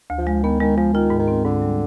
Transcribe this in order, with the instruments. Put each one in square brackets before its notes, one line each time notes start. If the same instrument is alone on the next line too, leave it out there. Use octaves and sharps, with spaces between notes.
[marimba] D2
[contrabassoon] F3
[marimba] G#3
[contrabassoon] D#3 [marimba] B3
[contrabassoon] D#3 [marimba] G#3
[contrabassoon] F3 [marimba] G#3
[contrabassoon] D#3 [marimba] F4
[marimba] G#2
[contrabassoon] D#3
[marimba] C4
[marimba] G#2 [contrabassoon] D3
[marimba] G3